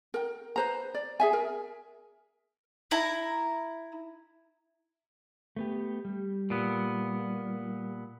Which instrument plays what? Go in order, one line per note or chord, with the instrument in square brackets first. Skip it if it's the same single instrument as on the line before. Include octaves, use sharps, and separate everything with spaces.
[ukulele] A#4 G5
B4 C5 A#5
D5
G#4 E5 G#5
A#4
[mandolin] E4 A#5
[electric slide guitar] A3 B3 G4
G3
[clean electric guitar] A#2 B3